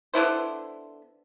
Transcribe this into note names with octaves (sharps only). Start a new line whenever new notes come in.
D3 B3 E4 C5